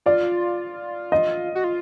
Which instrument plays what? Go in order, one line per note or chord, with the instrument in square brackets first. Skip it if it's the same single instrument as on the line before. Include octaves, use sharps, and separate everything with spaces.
[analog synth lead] F4 [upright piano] D5
[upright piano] D#5
[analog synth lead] F#4
F4